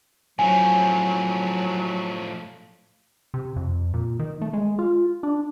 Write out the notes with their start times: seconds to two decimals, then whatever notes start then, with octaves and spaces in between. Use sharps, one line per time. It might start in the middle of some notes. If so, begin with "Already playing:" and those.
0.39 A2 F3 F#3 G#5
3.34 C3
3.56 F2
3.94 A#2
4.19 D#3
4.41 A3
4.53 G#3
4.79 F4
5.23 D4